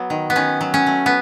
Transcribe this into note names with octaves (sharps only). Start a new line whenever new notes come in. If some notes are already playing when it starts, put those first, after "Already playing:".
Already playing: F#3 B3
D#3
B3
D#3 C#4
F#3
C#4
A3
B3